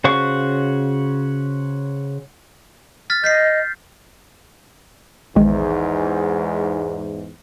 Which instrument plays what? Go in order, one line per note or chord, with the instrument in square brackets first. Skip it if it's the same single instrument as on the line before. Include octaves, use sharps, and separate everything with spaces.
[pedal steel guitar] C#3 F#4 C5 F5 C#6
[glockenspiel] F6 A6 B6
[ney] D#5 [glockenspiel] G6 B6 C7
[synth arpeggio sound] A#1 D#3 G#3 [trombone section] E2 G#2